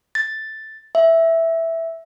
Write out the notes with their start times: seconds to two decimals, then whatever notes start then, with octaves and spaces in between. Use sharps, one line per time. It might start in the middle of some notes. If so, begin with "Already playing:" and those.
0.15 A6
0.95 E5